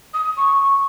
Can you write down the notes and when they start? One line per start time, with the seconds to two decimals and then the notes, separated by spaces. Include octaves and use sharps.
0.13 D#6
0.37 C#6